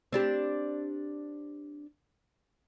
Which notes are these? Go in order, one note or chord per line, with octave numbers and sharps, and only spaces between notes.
C4 D4 G4